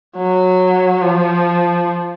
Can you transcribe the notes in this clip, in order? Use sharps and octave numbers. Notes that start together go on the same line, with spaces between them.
F#3
F3